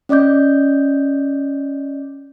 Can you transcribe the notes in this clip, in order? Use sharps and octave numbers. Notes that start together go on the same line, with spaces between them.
C#4 D5 D#5 D6 G6